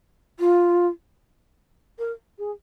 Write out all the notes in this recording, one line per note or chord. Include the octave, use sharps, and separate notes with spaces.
F4
A#4
G#4